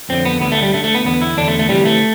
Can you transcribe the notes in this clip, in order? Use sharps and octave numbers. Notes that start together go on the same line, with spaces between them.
F2 D3 C4
B3
D2 D3 B3
A3
G3
D2 D3 A3
A3
B3
E2 D3 B3
E4
E2 D3 D4
A3
A3
D2 C3 E3 G3
A3